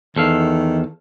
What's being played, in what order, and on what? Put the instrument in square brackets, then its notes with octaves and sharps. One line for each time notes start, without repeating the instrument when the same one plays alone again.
[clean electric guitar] E2 A4 F5 [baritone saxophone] D#3